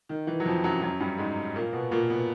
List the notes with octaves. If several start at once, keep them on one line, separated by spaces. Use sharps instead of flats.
D#3
E3
F#3
F2 F3
F#2 F#3
F#2 F#3
G2 G3
G#2 G#3
A#2 A#3
B2 B3
A#2 A#3
B2 B3